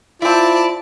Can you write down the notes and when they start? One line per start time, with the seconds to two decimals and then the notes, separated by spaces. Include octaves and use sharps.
0.22 C4 E4 F4 D5 A5